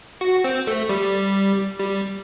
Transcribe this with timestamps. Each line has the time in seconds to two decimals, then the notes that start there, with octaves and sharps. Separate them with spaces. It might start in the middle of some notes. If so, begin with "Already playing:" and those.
0.21 F#4
0.44 C4
0.67 A3
0.89 G3
1.79 G3